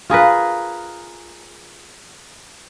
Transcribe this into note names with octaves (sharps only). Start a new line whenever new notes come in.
F4 G#4 A#4 B4